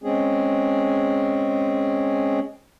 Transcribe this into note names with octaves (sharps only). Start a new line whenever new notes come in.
G#3 C4 C#4 G#4